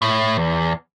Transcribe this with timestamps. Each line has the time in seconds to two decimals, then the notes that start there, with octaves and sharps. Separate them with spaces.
0.02 A2
0.37 E2